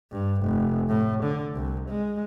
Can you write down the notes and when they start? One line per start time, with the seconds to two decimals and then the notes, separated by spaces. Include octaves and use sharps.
0.12 G2
0.42 F1
0.88 A2
1.23 D3
1.54 C2
1.89 G#3